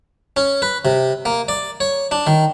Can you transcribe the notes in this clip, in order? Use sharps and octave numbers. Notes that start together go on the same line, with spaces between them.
C#4
B4
C3
A#3
D5
C#5
D4
D#3